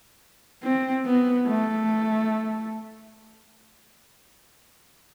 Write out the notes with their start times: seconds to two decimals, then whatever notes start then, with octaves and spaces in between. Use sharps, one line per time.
0.63 C4
1.06 B3
1.47 A3